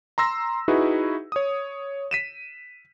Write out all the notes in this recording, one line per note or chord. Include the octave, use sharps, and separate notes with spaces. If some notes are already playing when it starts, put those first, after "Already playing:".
A#5 C6 E6 A#6
D#4 E4 F#4 G#4 B4
C#5 D#6
B6 D#7 E7